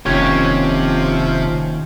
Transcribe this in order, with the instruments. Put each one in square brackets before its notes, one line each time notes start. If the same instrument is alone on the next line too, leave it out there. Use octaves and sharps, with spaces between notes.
[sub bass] F1 [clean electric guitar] D#2 C#4 C#5 [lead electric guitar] C3 G4 [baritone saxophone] F3